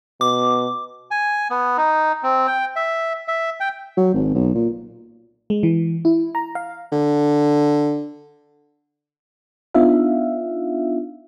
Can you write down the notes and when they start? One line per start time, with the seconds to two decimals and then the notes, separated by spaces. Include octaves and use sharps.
0.21 B2 D6
1.11 G#5
1.50 B3
1.78 D#4
2.23 C4
2.47 G5
2.76 E5
3.28 E5
3.60 G5
3.97 F#3
4.14 G#1
4.35 B1
4.55 A#2
5.50 G#3
5.63 E3
6.05 E4
6.35 A#5
6.55 F5
6.92 D3
9.74 B3 D4 D#4 F4 E5 F5